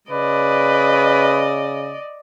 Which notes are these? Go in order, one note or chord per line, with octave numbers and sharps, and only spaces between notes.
C#3 B4 D5 D#5